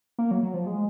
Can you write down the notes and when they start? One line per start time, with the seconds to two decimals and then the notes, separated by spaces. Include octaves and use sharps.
0.19 A#3
0.31 F#3
0.43 F#3
0.54 F3
0.67 G#3